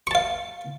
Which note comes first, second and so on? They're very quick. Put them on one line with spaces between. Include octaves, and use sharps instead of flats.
C#6 A5 F5